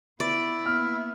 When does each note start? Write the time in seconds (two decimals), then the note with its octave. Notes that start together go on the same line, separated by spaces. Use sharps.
0.20 B3 E4 D5
0.66 A#3 B3 F6